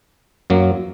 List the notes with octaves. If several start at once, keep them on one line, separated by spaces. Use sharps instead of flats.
F#2 F#3 A#3